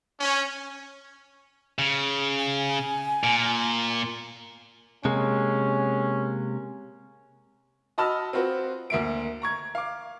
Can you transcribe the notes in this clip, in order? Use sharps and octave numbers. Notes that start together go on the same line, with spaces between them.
C#4
C#3
G#5
A#2
C3 G#3 A#3 C#4
F#4 D#5 A5 B5 E6 F6
C4 F4 F#4 B4
D2 A#3 E5 D7
A#5 C#6 G#6
F5 D6